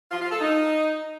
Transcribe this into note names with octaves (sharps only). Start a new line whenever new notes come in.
F4
F4
A4
D#4